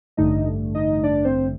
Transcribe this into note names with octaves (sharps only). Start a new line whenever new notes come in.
A1 G2 D3 A3 D#4 D#5
D#4 D#5
D4 D5
C4 C5